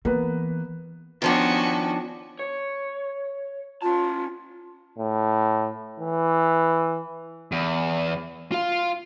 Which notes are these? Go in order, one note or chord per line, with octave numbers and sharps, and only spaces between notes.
E3 A#3 B3 B4
D#3 F3 B3 C#4 D4 F#4
C#5
C#4 F4 A5
A2
E3
E2
F4 F5